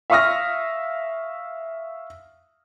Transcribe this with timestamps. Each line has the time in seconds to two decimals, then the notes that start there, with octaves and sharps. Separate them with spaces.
0.10 E5 F5 C#6 D#6 F6 A#6